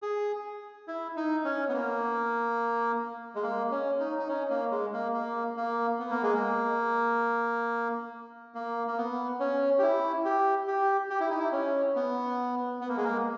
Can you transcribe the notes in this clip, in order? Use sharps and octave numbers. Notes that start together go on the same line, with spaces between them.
G#4
E4
D#4
C#4
B3
A#3
G#3
A#3
C#4
D#4
D#4
C#4
A#3
G#3
A#3
A#3
A#3
B3
A#3
G#3
A#3
A#3
A#3
B3
C#4
G4
E4
G4
G4
G4
E4
D#4
E4
C#4
B3
B3
A#3
G#3
A#3